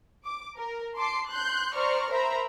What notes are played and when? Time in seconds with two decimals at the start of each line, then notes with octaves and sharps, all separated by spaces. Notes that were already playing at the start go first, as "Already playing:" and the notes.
0.24 D6
0.57 A#4
0.96 A5 C6 D6 C7
1.29 C6 F#6 G6
1.74 C5 D5 A#5 C#6 F6
2.11 A#4 C5 E5 A#5 B5